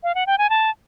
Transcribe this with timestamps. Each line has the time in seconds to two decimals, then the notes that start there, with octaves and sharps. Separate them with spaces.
0.03 F5
0.15 F#5
0.27 G5
0.38 G#5
0.50 A5